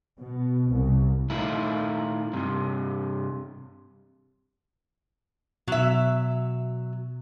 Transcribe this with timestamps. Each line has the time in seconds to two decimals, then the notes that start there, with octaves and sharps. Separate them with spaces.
0.19 B2
0.70 C2
1.30 A#2 D#3 A3 A#3 E4
2.33 G2 C3
5.68 B2 F#3 E5